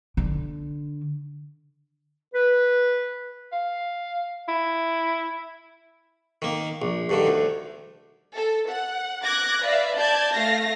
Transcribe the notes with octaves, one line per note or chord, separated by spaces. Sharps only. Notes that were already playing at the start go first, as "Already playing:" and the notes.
D3
B4
F5
E4
D#3 A#3
A#1
G2 D3 D#3
D2
A4
F#5
D6 F#6 G#6 A#6
B4 D5 E5 F5
D5 A5 G6 G#6
A3 F5 A#6